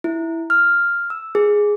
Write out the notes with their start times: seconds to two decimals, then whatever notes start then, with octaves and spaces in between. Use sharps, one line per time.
0.04 E4
0.50 F6
1.10 E6
1.35 G#4